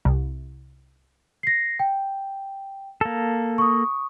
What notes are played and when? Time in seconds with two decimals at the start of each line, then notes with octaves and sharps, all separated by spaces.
0.05 C2
1.43 A#6 C7
1.79 G5
3.01 A#3 A4
3.58 C#6 D#6